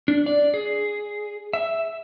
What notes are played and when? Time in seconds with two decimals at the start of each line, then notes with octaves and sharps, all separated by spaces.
0.08 D4
0.26 D5
0.54 G#4
1.53 E5